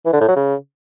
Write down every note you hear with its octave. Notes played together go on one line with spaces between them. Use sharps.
E3
D3
A2
F#3
C#3